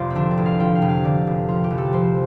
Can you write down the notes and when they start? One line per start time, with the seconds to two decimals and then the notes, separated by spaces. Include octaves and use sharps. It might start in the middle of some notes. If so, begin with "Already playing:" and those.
Already playing: F1 F3 F4 C5 D5 F5
0.10 C4
0.15 D3 D4
0.31 D5
0.37 A1
0.46 F5
0.60 F3 G5
0.75 F5
0.82 F1
0.89 F5
1.04 D3 D5
1.27 F1
1.48 F3 F4
1.64 G4
1.70 C2
1.78 A4
1.93 F3 C5